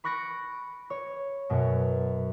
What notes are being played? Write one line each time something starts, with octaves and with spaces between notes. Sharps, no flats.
B5 C#6 F#6 A#6 C#7 D7
C#5
F#2 B2